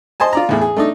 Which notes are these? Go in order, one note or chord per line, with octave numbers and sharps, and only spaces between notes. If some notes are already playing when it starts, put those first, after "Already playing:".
C5 D#5 G#5 A5
F4 D5 A#5
E2 A2 G#4
G#4
A3 D4 D#4